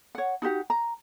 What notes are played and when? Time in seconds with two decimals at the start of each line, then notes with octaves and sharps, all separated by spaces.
0.15 C#5 F#5
0.42 D#4 F#4 G4 F#5
0.70 A#5